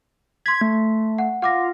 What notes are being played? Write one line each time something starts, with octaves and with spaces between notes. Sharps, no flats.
C6 G#6 B6
A3
F#5
F4 F#5 D6 A#6